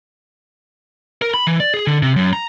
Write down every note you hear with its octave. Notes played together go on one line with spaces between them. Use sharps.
A#4
B5
E3
D5
G#4
D3
C3
F#2
A#5